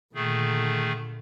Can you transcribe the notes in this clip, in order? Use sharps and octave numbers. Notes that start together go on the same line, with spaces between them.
A#2 D3 D#3 A3 G#4